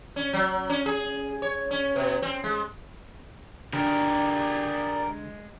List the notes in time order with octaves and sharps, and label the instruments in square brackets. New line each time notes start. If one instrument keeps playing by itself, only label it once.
[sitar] C#4
F#3
C#4
G#4
C#5
C#4
B2
C4
G#3
[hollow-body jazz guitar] D3 [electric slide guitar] G4 G#4 A#4 [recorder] D5
[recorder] G#3